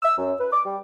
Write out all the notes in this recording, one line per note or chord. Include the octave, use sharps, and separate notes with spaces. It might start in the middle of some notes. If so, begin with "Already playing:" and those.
E6
F#2
B4
D6
G3